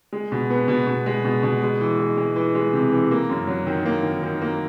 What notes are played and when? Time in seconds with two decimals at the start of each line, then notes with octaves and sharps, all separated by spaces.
0.13 G#3
0.32 B2
0.50 B3
0.68 B2
0.87 B2
1.06 G#3
1.25 B2
1.43 B2
1.62 G#3
1.81 E3
1.99 G#3
2.17 G#3
2.36 E3
2.55 G#3
2.73 C3
2.92 E3
3.11 A#3
3.29 F#2
3.47 F#3
3.67 D#3
3.85 A#3
4.03 D#3
4.23 D#3
4.41 A#3